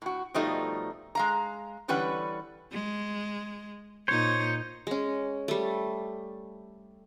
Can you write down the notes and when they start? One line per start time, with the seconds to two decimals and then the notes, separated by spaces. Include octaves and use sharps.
0.02 A2 F#4
0.34 B2 F3 G3 A3 D#4
1.15 G#3 F5 A#5
1.88 D3 E3 G3 C#4 B4 F#5
2.72 G#3
4.08 A#2 D#4 C5 C#5
4.87 G#3 C#4
5.48 G3 A3